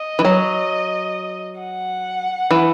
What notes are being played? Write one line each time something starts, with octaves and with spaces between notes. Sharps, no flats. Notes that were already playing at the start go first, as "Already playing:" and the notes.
Already playing: D#5
E3
F#3
F#5
E3